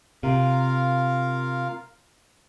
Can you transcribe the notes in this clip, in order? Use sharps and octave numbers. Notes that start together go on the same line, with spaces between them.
C3 F4 A#4 F5